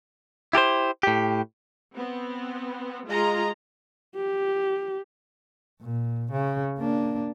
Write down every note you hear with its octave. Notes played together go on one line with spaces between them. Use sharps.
E4 G4 A4 C5
A2 G4
B3 C4
G#3 F4 D#5 A#5
G4
A#2
C#3
A#3 D4